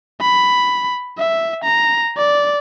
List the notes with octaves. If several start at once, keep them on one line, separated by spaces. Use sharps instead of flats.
B5
E5
A#5
D5